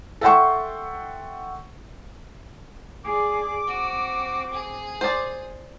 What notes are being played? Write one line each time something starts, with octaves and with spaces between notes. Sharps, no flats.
A4 E5 F#5 G5 C6 C#6
G#4 D5 D6
C4 F#4
G#4
C5 D5